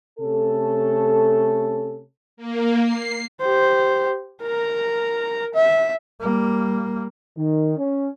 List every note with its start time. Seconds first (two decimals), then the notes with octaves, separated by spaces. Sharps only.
0.19 C3 A3 C#4 A4
2.37 A#3
2.83 C7
3.40 G4 C5
4.42 A#4 A#5
5.54 E5
6.21 G3 A#3
7.37 D#3
7.77 C#4